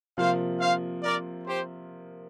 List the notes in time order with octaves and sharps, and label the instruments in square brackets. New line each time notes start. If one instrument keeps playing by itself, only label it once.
[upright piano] C3 F3 A#3 F4 [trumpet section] C5 F5
[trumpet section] C5 F5
A#4 D5
G4 C5